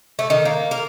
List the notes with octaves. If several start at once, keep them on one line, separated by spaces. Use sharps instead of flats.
A3
D#3
A#3
A#4